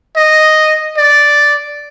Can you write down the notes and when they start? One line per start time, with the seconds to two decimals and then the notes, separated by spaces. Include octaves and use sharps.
0.17 D#5
0.98 D5